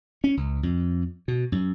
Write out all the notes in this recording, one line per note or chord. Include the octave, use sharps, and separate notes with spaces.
C#4
C#2
F2
B2
F#2